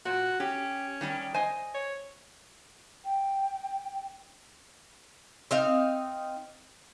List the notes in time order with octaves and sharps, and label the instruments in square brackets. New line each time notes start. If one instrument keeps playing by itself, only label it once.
[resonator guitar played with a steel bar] A#2 [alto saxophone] F#4
[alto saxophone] C#4 [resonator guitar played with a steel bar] G4
[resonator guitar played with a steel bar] D#3 G3 G4
C5 D#5 G#5
[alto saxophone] C#5
[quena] G5
[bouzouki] C4 D#4 F5